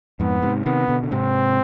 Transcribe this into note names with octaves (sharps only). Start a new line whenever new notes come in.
F2 G#2 B3
G#2 C3
C3 D#3 B3
B2 D3
D3
G#2 C3 C4